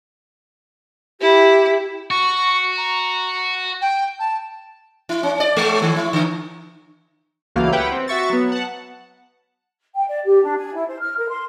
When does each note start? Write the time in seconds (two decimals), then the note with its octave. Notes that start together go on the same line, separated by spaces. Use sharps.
1.21 E4 G4
2.11 F#4 C#6
2.77 A#5
3.81 G5
4.19 A5
5.09 E4
5.23 C#4
5.40 D5
5.57 G#3
5.82 D#3
5.96 E4
6.13 D3
7.56 C#2 E3 F#3 A3 A#3 F5
7.72 E4 G4 B4 F#5 G5
7.92 C4
8.08 F#4 E5 C#6 A6
8.30 F#3 B3
8.52 F#5 A5
9.95 G5
10.08 D5
10.25 G4
10.43 D4
10.58 G#5
10.75 E4
10.88 C5
11.01 F6
11.17 A#4
11.30 C6